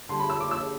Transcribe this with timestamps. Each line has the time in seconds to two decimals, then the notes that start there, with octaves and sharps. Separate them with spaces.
0.09 D3 G3 D4 C6
0.20 B5
0.30 E6
0.40 D6
0.51 E6